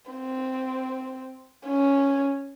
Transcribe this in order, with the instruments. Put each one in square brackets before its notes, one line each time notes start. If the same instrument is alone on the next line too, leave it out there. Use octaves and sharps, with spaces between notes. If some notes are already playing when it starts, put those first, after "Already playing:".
[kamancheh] C4
C#4